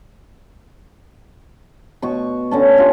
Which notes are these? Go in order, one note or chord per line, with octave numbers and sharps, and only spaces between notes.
B2 C#6
D3 C#4 A5
A3 C#4 F4 G4